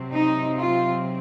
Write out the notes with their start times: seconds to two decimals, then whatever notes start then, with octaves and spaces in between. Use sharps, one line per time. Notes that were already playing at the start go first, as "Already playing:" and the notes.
Already playing: C3 F#3 C4
0.13 D#4
0.59 F4